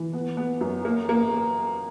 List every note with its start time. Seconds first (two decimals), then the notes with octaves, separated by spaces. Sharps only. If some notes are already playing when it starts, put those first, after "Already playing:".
Already playing: E3
0.13 B3
0.37 B3
0.61 F#2
0.85 A#3
1.09 A#3